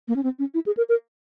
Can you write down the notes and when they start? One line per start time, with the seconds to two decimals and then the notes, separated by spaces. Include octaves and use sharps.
0.08 A#3
0.16 C#4
0.23 C4
0.39 C#4
0.54 E4
0.66 G#4
0.77 A#4
0.89 A#4